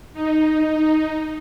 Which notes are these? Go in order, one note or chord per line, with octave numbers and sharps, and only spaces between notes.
D#4